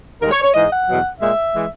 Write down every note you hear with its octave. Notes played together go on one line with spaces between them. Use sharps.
D#2 D#3 G#3 A#4
C#5
C#5
G#2 E3 G#3 D#5
F#5
E2 B2 F#3
A#2 G#3 E5
E3 G#3